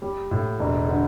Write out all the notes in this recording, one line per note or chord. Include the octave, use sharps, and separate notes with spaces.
G3
A2
E1
D3